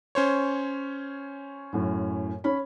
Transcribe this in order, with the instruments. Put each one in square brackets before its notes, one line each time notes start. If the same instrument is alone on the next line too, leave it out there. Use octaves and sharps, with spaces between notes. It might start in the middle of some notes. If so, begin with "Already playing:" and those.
[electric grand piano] C#4 C5 C#5
[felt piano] F#2 A2
C#4 B5